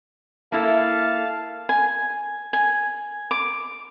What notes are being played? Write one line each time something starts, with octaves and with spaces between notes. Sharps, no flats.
A#3 E4 A4 F5 A5
G#5
G#5
D6